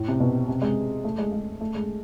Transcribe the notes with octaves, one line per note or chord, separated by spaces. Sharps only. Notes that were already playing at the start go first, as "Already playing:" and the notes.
Already playing: A2
C3
B2
C3
G#3
A3
G#3
G#3
A3
G#3